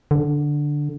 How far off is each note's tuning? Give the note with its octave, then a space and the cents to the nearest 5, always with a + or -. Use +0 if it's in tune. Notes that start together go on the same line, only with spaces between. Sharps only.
D3 +0